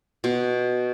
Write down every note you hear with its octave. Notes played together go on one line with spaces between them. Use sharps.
B2